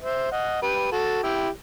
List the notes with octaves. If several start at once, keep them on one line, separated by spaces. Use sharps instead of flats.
C5 E5
D#5 F#5
G4 B4
F#4 A4
E4 G4